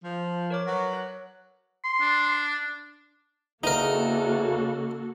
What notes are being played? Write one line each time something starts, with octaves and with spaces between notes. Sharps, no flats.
F3
A#4 C#5 D6
F#3 F#4 B4
C#5 F#6
C6
D4
E2 C#3 A#3 D#4 F#4 A4 A#4